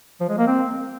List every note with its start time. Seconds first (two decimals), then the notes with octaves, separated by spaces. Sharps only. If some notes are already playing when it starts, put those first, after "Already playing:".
0.20 F3
0.29 G#3
0.38 A#3
0.47 C4